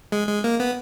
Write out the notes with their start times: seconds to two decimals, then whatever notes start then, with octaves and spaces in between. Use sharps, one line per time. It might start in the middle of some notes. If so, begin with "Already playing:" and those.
0.12 G#3
0.28 G#3
0.44 A#3
0.60 B3